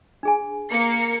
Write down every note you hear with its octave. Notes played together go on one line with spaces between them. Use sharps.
D4 G#4 G#5
A#3 C#7